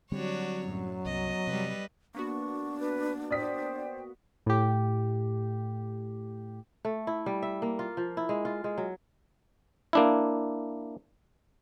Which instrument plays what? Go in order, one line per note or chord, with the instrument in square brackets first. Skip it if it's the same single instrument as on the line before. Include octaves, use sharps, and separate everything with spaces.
[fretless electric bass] D3 G3 C4 [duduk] F#3 [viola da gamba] D4 F#4 C#5
[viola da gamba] F#2 A2
[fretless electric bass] C2 [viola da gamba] B3 [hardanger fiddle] D#5
[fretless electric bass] C3 [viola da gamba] G3 B4
[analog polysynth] A#3 B3 F#4 [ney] D4 [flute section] C#6
[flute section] B4
[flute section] C5 G5 [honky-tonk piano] D5 D#6 B6
[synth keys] A2 G4
[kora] A3
E4
G3
E5
A#3
F4
F3
E4
G#3
F4
G#3
F#3
[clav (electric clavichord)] A#3 D4 E4